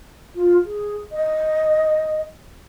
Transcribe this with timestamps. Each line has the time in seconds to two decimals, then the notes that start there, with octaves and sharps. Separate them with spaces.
0.35 F4
0.65 G#4
1.12 D#5